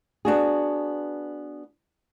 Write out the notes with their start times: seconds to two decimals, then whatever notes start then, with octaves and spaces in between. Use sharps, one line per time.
0.25 B3 D4 F#4 G#4